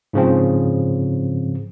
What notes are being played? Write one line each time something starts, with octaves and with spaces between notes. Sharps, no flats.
G#2 C#3 F3 C4